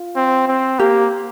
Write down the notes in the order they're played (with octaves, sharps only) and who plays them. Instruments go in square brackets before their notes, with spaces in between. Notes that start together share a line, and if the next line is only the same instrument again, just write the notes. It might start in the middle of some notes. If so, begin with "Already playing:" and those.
Already playing: [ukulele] F4
[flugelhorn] C4
C4
[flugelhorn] A#3 [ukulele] G4